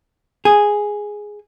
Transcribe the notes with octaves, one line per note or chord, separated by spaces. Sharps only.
G#4